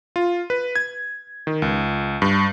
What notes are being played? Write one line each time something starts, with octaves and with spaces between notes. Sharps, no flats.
F4
B4
G#6
D#3
C#2
G2